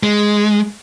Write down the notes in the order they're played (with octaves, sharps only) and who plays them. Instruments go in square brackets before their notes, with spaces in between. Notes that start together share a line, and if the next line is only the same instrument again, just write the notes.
[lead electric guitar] G#3